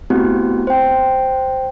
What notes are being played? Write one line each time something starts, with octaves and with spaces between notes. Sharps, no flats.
A3 B3 C4 E4 F#4 G4
C5 G5